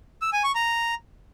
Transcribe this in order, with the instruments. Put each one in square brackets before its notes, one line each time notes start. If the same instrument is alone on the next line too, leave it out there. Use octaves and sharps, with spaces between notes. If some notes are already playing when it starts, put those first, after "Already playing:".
[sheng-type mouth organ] E6
G#5
C#6
A#5